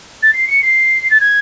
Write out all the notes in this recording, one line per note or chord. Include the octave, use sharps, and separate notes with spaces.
A6
C7
C#7
C7
A6
G#6